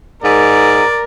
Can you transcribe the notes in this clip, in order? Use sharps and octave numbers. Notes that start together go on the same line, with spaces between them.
G#2 A#4 D5